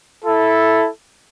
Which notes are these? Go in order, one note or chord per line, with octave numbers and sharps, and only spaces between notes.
E4 A4